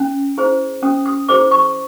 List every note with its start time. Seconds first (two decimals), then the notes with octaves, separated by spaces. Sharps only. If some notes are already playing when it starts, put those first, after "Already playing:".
Already playing: C#4
0.38 E4 G#4 C5
0.83 C#4 D#6
1.06 D#6
1.28 E4 G#4 C5 D6
1.51 C#6